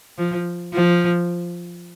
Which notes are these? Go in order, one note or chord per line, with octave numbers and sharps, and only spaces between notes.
F3
F3